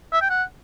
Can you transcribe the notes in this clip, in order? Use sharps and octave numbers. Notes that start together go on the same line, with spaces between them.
E5
G5
F#5